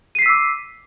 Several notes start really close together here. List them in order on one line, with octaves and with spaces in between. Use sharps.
D#7 C7 B6 E6 D6